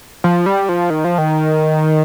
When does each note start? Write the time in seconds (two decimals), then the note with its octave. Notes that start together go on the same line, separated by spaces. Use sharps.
0.24 F3
0.46 G3
0.69 F3
0.90 D#3
1.04 F3
1.18 D#3